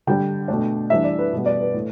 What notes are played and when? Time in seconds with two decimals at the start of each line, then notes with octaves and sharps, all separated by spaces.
0.07 D3 G3 D4 G5
0.48 B2 A3 D4
0.90 E3 G3 D4 E5
1.04 D5
1.19 B4
1.33 B2 G3 B3
1.46 D5
1.61 B4
1.74 A2 A3